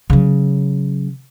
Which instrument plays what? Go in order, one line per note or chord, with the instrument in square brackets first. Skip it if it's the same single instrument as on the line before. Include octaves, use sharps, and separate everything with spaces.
[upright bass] C#3 F#3